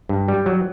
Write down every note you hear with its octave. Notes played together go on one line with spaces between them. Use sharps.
G2
G3
F#3